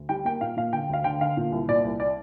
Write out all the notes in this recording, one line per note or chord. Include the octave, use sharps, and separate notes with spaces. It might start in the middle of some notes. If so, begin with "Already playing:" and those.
Already playing: D2
G3 G5
A#3 G5
A#2 F5
A#2 F5
D3 G5
D2 F5
D3 G5
D3 F5
A#2
C2
A#2 D5
C2
D5